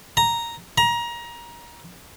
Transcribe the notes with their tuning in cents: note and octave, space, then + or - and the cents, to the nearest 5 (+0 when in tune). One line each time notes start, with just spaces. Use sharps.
A#5 +0
A#5 +25